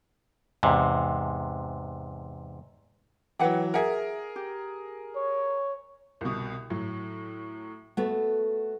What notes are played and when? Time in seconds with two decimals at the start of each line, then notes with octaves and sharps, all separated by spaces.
0.63 E2 G#2 C3
3.39 E3 F#3 B4 F#5 G5
3.74 G#4 A#4 E5 F#5
4.36 G4
5.16 C#5
6.21 C2 B2
6.70 A2 F#3
7.97 A3 B3 F#4